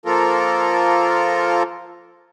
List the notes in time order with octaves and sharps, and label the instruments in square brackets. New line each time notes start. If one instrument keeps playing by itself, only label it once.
[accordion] F3 A#3 F4 A4 A#4